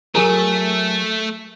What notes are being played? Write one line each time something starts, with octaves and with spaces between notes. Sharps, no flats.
F#3 A3 G#4 A#4